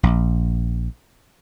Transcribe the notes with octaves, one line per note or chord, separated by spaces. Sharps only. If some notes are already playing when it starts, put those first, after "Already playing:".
A#1